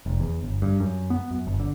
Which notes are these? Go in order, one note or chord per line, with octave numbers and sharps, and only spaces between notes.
F1
E2
G1
G2
F#2
B3
F#2
G1
D3